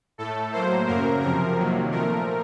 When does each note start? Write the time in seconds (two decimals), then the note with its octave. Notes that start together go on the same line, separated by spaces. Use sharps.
0.18 A2 A3 A4
0.52 A2 F#3 A#3 C5
0.87 F#2 C#3 F#3 A#3 A#4
1.22 F2 C3 F3 A#4
1.56 C3 D#3 F#3 A#3
1.91 A#2 F3 A3 A#4